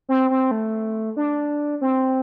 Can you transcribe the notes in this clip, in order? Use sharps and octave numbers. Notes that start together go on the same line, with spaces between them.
C4
C4
A3
D4
C4